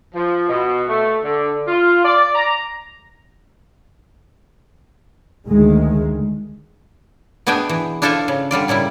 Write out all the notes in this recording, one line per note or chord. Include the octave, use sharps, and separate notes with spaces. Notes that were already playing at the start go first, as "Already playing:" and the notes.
F3
B2
A3
D3
F4
D5
A#5
D2 D#3 G#3
B2 B3 D4 G#4 E5 G5
E3
D4 E4 F4 A4 C5 E5
C#3
D3 G3 F4 D5
A#2 C#3 G3 E4